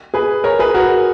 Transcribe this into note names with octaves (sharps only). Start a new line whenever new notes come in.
G#4 B4
A#4 C#5
G#4 B4
F#4 A#4